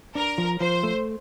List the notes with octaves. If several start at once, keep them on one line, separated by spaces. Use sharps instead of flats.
D4 A#4
F3
F3 C5
A3